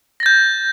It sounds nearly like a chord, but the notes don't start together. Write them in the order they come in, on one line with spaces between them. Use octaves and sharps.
A#6 A6 G6